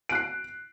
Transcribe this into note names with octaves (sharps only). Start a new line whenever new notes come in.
F#6 C7 D7